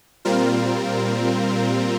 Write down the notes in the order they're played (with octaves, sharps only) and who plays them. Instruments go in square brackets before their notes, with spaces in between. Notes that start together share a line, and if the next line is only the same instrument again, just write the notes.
[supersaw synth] A#2 G3 C4 F4 A#4